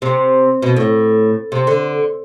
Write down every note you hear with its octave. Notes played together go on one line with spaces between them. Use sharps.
C3
B2
A2
C3
D3